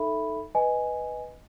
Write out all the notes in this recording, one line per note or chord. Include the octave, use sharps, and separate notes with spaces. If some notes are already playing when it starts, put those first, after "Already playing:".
Already playing: D#4 A4 E5 B5
B4 D#5 G#5